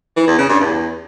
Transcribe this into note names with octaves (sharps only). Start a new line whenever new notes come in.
E3
E2
C#3
G2
E2